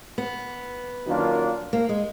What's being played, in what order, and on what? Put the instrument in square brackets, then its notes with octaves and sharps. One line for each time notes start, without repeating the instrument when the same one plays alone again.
[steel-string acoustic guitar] B3
[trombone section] F#2 D#3 A#3 D4 F4
[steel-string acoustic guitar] A#3
G#3